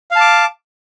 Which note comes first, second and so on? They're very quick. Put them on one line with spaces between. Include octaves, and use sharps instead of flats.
F5 A5 D6